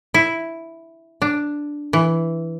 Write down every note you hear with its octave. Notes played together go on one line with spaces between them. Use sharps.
E4
D4
E3